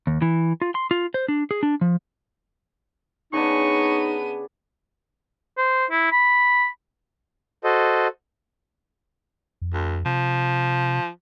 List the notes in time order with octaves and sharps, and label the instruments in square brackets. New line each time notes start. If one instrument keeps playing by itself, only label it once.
[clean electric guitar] D#2
E3
F4
C6
F4
C5
D4
G#4
D4
F3
[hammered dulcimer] C#3 D4 [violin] B3 D#7 [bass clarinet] D#4 [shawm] C#6
[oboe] C5
E4
B5
[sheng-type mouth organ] F#4 A4 C5 D#5
[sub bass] F2
[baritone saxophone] D2
[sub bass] C3 [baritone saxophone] F3